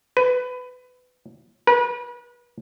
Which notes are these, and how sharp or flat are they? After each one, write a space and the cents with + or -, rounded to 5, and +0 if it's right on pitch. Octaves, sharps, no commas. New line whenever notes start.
B4 +20
B4 -35